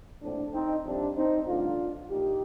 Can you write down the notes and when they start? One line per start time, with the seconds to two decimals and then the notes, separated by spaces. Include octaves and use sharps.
0.22 A#1 A2 A3 C4 D4
0.54 C4 D#4
0.85 F2 C3 G3 C4 D4
1.17 C4 D#4
1.47 A1 G2 D3 A3 D4 F4
2.10 A#1 A#2 D#4 G4